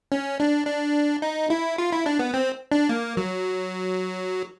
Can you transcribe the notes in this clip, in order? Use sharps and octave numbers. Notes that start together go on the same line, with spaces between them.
C#4
D4
D4
D#4
E4
F4
E4
D4
B3
C4
D4
A#3
F#3